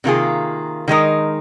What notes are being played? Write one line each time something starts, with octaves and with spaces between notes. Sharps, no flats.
C3 D#3 A#3 F4 G#4
D#3 G#3 D#4 A#4